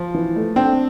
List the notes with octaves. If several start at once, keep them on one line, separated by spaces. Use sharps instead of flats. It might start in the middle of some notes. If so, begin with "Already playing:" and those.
Already playing: F3
E3
A3
C4 D4